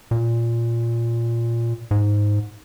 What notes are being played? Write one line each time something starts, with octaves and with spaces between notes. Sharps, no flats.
A#2
G#2